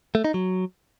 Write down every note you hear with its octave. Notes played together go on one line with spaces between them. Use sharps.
A3
D#4
F#3